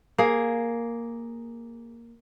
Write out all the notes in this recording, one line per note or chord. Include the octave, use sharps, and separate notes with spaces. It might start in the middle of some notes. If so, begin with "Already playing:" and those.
A#3 G#4